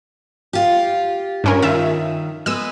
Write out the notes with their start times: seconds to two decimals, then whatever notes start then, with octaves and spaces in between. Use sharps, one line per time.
0.53 F4 G4
1.44 G2 C#4 A#4
1.62 D#3 F4 E5
2.46 G#3 B3 E6